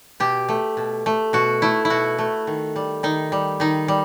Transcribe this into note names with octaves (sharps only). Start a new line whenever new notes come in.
B2 G4
A3
B2
A3
B2 F#4
A3 E4
E4
B2 F#4
A3
D#3
G3
D#3 D#4
G3
D#3 D#4
G3